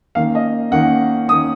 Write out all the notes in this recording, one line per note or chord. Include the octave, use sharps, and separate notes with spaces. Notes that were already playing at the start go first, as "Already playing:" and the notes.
D#3 A#3 C#4 F5
D#5
D#3 A#3 C#4 F#5
D#3 A#3 C#4 D#6